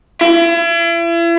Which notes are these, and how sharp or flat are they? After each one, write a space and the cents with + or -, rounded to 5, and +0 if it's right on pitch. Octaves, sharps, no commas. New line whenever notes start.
E4 +40